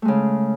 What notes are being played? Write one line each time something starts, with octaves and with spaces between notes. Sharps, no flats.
C#3 G#3 A3